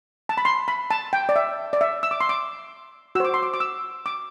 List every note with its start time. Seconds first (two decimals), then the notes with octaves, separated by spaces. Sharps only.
0.29 A5
0.38 B5
0.45 C6
0.68 B5
0.91 A5
1.13 G5
1.29 D5
1.36 E5
1.73 D5
1.81 E5
2.03 E6
2.11 D6
2.21 C6
2.29 D6
3.15 F#4 E6
3.20 C5 D6
3.34 C6
3.43 D6
3.54 D6
3.60 E6
4.06 D6